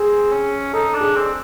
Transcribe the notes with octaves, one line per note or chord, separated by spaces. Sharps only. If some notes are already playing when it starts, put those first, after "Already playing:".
Already playing: C4 G#4
C#4
D#4 A4
D4
G#4
C4